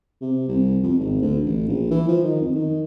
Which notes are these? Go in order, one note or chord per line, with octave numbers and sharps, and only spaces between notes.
C3
C2
F2
G#1
D2
A1
A#1
E3
F3
D#3
F2
D#3